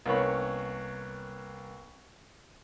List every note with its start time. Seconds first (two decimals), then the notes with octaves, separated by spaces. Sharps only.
0.06 C2 A#3 B3 C#4 C#5 B5